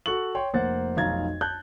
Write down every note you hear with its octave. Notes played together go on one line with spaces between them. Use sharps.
F#4 A4 F#5 C#6 F#7
C#5 G5 C6
F1 A#3 C5 F#5 A6
F1 B1 F5 A#5 G#6 A6
A5 F#6 G6